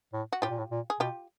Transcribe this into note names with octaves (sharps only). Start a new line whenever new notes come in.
A2
F#4
A2 F4 G4
A#2
A2
A#2
G#4
B2 F4 G4